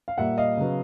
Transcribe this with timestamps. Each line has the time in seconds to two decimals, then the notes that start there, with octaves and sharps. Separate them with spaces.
0.08 F5
0.18 A#2 G3 A#3 E5 F#5
0.38 D#5 F5
0.57 C#3 F#3 B3